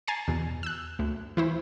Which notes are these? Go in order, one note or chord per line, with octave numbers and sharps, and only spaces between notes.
G#5 A#5 A6 C7
E2 B2
E6 F#6
D2
E3 E4 C5